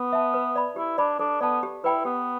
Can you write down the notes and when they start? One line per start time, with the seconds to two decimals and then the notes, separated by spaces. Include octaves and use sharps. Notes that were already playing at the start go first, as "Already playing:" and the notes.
Already playing: B3
0.13 E5 A5
0.34 B4
0.56 D5 B5
0.76 E4 G4
0.98 D4 D5 B5
1.19 D4 A4
1.41 B3 D5 A5
1.63 G4
1.84 E4 B4 G5 B5
2.05 B3 G4